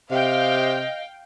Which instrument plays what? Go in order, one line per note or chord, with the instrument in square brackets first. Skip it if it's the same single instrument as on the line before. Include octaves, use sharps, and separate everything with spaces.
[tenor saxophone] C3 [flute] D#5 [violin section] F5 G5